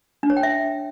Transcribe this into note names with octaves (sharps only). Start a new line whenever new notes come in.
D4
C#5
G5
E5